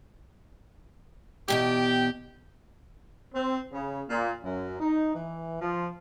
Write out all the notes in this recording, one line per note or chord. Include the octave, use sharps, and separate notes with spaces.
E2 B2 G4 G5
C4
C#3
A#2
F#2
D#4
E3
F3